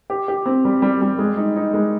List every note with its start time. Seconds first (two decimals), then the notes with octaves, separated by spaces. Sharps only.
0.10 G4
0.28 G4
0.46 C4
0.65 G3
0.82 G3
1.02 G3
1.19 G#3
1.37 D#4
1.56 D#4
1.73 G#3